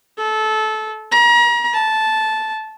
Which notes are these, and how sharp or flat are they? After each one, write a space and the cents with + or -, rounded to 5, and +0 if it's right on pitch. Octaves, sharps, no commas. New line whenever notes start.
A4 -20
A#5 +35
A5 -10